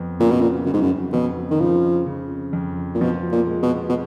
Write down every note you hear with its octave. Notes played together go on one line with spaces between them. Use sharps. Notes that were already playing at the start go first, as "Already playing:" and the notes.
Already playing: F2 B3
A#2 C#3
B2
A#2
F#2 C#3
G#2
F#2
F2 B2
D#3
C#3 F3
C#3
F2
A#2
B2 F3
A#2
G#3
B2
B2